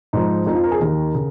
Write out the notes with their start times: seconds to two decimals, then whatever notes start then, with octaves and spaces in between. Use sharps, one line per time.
0.13 G#2 F3 D#4
0.46 F2 F3 D#4
0.55 F4
0.64 A#4
0.71 G#4
0.80 D#2 D#3 A#4
1.15 C#3